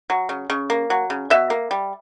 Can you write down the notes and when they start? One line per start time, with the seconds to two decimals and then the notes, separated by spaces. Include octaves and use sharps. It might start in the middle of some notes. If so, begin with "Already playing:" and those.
0.10 F#3
0.29 C#3
0.50 C#3
0.70 A#3
0.90 F#3
1.10 C#3
1.30 B2 E5
1.50 A#3
1.71 G3